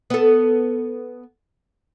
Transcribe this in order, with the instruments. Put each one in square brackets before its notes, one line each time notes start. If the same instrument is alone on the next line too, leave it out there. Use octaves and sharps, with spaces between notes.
[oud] B3 A4